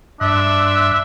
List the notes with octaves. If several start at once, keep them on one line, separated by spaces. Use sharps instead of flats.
G2 D4 E5 C6 F#6